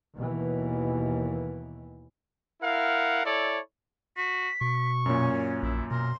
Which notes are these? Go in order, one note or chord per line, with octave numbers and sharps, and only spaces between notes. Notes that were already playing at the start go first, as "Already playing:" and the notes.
D#2 B2 E3
E4 A#4 F5 F#5
E4 A4 C#5 D5
F#4 B6
B2 C#6
F#2 A#2 C#4
A#1 E4
B2 A#4 C6